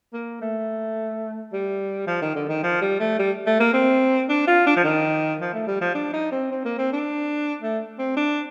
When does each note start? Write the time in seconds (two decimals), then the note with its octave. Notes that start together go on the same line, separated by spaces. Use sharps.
0.13 A#3
0.42 A3
1.53 G3
2.07 F3
2.22 D#3
2.35 D3
2.49 D#3
2.63 F3
2.81 G3
3.00 A3
3.19 G3
3.47 A3
3.60 A#3
3.74 C4
4.29 D4
4.47 F4
4.67 D4
4.77 F3
4.84 D#3
5.40 F3
5.53 A3
5.67 G3
5.81 F3
5.95 D4
6.13 D#4
6.32 C4
6.51 C4
6.65 A#3
6.78 C4
6.93 D4
7.62 A3
7.99 C4
8.16 D4